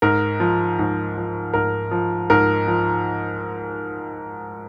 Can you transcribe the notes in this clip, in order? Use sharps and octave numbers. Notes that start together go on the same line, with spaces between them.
G#2 A#4
F3
G#2
F3
G#2 A#4
F3
G#2 A#4
F3